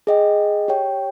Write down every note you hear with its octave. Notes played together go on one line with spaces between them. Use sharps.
G#4 D#5 G5
G4 C#5 G5